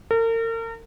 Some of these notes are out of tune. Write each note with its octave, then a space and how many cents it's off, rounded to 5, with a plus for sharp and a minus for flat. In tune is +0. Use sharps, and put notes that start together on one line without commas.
A#4 -40